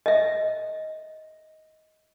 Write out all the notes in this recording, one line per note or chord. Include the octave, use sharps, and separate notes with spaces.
D#5 E5